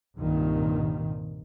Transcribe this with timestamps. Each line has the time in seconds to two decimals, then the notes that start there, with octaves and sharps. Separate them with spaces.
0.19 C2 G2 A#2 D#3